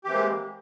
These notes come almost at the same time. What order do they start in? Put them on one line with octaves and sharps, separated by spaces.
G4 E3 C4 A#3 G#3